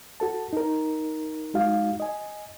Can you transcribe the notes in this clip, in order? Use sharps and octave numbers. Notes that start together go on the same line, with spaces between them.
F#4 A4 A5
D#4 A#4
G#3 D#4 F#4 F5
D#5 G#5